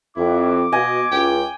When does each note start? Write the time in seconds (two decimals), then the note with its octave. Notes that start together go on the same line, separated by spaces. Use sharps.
0.16 F2 E4 D6
0.72 B2 D#5 G#5
1.12 C#2 G5